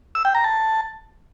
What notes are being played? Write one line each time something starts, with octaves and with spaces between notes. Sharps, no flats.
E6
G5
A#5
A5